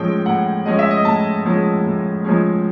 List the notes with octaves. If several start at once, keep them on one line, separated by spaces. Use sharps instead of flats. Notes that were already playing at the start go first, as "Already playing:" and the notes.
Already playing: A2 F3 G#3 C#4 G5
A2 F#5
F3 G#3 C#4 D#5
E5
D#5
A2 A5
F3 G#3 C#4
A2
F3 G#3 C#4